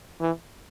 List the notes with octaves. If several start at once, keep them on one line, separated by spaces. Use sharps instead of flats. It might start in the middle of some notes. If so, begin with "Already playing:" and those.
E3